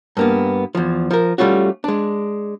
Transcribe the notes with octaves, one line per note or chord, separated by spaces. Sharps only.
G2 A#3 B3
E2 F3
F3 A#4
G3 A3 C#4 F4 F#4
G#3 D4